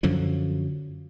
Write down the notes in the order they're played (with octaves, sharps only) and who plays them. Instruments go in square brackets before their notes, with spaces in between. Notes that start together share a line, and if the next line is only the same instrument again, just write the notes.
[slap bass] F#2 D3 F3 F#3